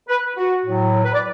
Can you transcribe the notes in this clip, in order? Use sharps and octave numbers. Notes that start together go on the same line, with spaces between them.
B4
F#4
A2 F#3
A4
B4
D5